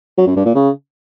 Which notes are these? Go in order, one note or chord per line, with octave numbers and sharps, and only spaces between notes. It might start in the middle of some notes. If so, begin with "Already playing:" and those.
F#3
F#2
G2
A#2
C#3